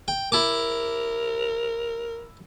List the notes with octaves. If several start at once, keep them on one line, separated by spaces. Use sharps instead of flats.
G5
E4 A#4 A5 D6